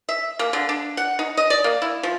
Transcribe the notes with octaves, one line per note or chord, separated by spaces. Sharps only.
E5
A#3
D3
D4
F#5
D#4
D#5
D5
A#3
E4
F3